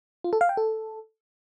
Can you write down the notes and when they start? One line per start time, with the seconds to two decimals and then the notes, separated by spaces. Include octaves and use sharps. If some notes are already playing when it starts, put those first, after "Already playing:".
0.24 F4
0.33 A4
0.41 F5
0.49 G5
0.57 A4